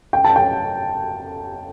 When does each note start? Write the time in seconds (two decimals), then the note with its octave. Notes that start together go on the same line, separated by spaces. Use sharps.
0.13 G5
0.24 A5
0.36 G5